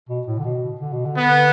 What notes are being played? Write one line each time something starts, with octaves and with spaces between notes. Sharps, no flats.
B2
A2
D3
B2
D3
B2
D3
B3